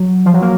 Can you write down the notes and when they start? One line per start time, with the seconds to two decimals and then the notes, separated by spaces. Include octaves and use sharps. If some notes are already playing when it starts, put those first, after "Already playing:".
Already playing: F#3
0.25 F3
0.34 F#3
0.42 A#3